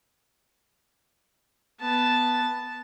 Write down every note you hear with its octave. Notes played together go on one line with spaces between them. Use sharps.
B3 A5